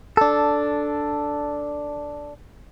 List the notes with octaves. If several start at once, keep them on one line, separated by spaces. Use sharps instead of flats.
D4 A4